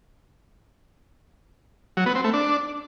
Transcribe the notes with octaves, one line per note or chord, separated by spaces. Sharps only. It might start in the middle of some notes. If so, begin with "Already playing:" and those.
F#3
B3
C4
A3
D4